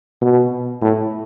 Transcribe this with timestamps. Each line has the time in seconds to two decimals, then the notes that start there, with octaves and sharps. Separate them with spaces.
0.21 B2
0.82 A2